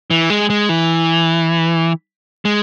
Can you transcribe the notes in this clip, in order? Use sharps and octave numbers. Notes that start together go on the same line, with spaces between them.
E3
G#3
G#3
E3
G#3